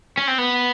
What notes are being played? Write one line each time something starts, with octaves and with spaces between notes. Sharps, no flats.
C#4
C4
B3